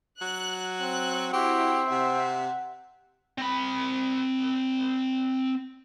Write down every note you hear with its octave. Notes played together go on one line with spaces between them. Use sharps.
F#3 F#6
C4 F#6
C4 E4 F#4 G4
C3 E5 F#5
C4 B5